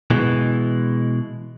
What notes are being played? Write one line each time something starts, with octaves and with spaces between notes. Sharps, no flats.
B2 E3 G#3